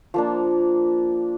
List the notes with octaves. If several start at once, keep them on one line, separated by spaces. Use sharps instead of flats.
F3 A#3 D4